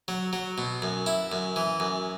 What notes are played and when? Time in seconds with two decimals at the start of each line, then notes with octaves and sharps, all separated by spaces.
0.08 F#3
0.33 F#3
0.58 B2
0.82 F#2
1.06 E4
1.32 F#2
1.56 E3
1.80 F#2